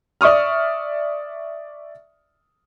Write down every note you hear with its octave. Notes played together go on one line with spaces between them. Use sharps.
D5 E5 C#6 D#6 F6